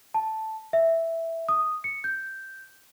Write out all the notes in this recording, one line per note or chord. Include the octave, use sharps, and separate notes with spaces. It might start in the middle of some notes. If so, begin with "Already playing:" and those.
A5
E5
D#6
C#7
G6